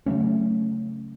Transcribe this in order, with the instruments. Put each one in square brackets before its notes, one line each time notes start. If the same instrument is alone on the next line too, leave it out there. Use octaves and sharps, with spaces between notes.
[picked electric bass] C#3 F#3 A3 C#4